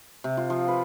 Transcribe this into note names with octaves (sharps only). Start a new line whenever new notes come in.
C3
F4
F3
B4